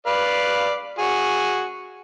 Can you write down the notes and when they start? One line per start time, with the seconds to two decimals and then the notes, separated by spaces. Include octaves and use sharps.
0.07 B4 D5 F5
0.99 F#4 G#4